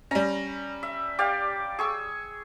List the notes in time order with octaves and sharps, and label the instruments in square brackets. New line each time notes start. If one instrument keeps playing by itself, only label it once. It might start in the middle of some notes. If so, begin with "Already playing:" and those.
[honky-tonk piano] G3 C#4 [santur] A#5
[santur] E5
G4 D5 F5
G#4 C#6 E6